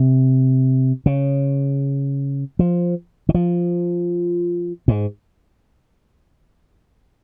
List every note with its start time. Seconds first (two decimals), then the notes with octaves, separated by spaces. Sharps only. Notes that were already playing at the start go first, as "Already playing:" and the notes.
Already playing: C3
1.06 C#3
2.59 F3
3.29 D#3
3.34 F3
4.88 G#2